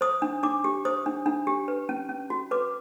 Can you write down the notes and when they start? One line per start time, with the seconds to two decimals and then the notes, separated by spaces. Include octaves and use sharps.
0.01 C5 D#6
0.22 D4
0.43 D4 D6
0.64 G4
0.85 C5 D#6
1.06 D4
1.26 D4
1.47 G4
1.68 B4
1.89 C#4
2.09 C#4
2.30 F#4
2.51 B4 D6